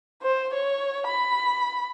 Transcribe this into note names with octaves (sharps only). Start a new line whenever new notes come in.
C5
C#5
B5